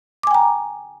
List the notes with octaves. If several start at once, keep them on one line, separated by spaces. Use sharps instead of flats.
G5 G#5 A#5 D6